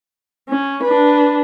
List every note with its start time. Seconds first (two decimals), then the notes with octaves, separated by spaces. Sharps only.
0.49 C#4
0.84 D4 B4